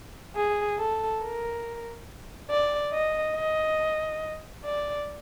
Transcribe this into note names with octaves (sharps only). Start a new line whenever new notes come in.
G#4
A4
A#4
D5
D#5
D#5
D5